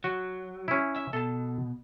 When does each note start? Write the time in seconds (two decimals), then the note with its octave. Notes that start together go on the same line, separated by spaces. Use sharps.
0.04 F#3 F#4
0.68 C#4 E4
0.96 E5
1.13 B2 A4 A5